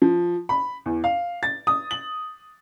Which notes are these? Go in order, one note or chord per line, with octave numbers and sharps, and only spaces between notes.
F3
B5
E2
F5
A6
D#6
F#7